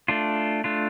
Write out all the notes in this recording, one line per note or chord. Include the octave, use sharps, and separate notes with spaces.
A3 D4 F4
A3 D4 F4